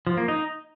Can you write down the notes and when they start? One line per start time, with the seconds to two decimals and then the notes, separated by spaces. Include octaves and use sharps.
0.07 F3
0.17 A#3
0.28 D#4